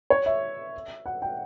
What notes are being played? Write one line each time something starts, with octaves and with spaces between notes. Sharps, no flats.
C#5
E5
F#5
G5